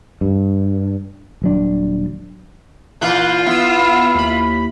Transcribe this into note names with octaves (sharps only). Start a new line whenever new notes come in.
G2
D#1 F#3 D4
A#2 E3 F4 F#6 G6
B3 E4 E6
D#2 B5